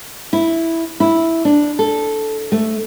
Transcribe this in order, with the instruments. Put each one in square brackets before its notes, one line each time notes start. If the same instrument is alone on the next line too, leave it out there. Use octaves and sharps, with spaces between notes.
[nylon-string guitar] E4
E4
D4
A4
A3